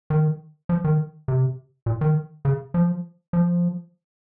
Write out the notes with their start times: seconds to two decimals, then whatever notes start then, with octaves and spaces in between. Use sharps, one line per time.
0.10 D#3
0.69 F3
0.84 D#3
1.28 C3
1.86 A#2
2.01 D#3
2.45 C#3
2.74 F3
3.33 F3